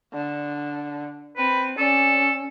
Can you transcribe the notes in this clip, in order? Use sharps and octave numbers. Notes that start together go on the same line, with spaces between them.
D3
C4 B4
C#4 A4 D5